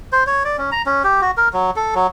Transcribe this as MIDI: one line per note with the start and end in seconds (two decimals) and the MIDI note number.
0.12 0.24 72
0.27 0.43 73
0.45 0.57 74
0.58 0.70 61
0.72 0.82 82
0.86 1.03 61
1.04 1.21 67
1.21 1.31 66
1.37 1.49 70
1.53 1.71 54
1.76 1.94 69
1.95 2.07 54